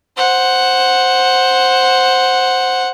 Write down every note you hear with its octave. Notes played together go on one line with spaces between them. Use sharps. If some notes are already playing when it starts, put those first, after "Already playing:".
C5 F#5